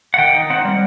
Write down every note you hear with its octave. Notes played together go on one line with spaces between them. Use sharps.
F#5
D#3 G5
D#4
C4 F#5
G3